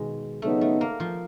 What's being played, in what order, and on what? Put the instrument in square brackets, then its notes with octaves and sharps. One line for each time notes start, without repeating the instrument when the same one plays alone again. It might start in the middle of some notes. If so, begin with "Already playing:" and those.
Already playing: [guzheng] B2 D#3 G#3
[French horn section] C#3 F#3 B3 D#4 [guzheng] A3
[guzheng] A3
A#3
F3